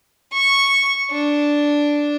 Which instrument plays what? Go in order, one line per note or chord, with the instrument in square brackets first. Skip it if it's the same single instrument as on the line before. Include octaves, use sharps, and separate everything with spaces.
[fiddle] C#6
D4